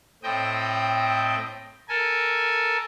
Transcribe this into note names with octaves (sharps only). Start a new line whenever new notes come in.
A2 C4 D#5 G5
A4 A#4 G#5